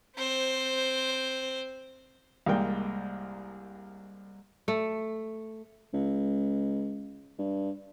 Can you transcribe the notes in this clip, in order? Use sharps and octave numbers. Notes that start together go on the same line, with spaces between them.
C4 C5
C2 G3 G#3 A#3 G5
A3
C#2
G2